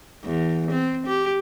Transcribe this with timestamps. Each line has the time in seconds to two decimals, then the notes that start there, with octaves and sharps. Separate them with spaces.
0.24 E2
0.71 C4
1.07 G4